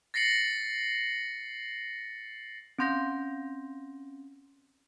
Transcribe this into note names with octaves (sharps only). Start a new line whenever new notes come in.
A6 A#6 C7 C#7 F#7
C4 C#4 C6 G6 A#6